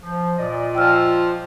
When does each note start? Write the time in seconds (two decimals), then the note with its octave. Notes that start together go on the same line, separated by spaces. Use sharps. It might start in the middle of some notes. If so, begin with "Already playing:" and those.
0.03 F3
0.38 A#2 D5 D#5
0.75 F3 G5 E6 F6